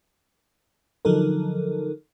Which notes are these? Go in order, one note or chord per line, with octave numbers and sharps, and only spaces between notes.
D3 F3 F#3 D#4 A4 A#4